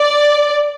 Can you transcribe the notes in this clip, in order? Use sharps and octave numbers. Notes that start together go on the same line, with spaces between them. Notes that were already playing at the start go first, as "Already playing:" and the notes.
Already playing: D5